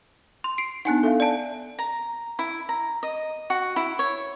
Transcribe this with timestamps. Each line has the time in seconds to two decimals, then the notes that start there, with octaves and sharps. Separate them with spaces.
0.44 C6
0.58 C7 D7
0.85 B3 D4 D#4 F#5 G#5 F#6
1.03 A4 E5 F5
1.20 D5 G#5 A5
1.79 A#5
2.39 E4
2.69 A#5
3.03 D#5
3.50 F#4
3.76 E4
3.99 C#5